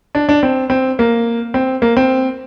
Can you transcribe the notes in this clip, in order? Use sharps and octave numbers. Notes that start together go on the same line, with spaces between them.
D4
D4
C4
C4
A#3
C4
A#3
C4